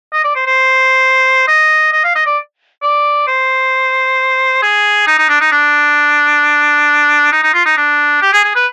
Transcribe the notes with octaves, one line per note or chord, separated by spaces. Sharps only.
D#5
D5
C5
C5
D#5
D#5
F5
D#5
D5
D5
C5
G#4
D#4
D#4
D4
D#4
D4
D#4
D#4
F4
D#4
D4
G4
G#4
G#4
B4